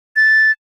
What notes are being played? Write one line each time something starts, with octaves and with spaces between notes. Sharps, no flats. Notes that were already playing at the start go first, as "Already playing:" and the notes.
A6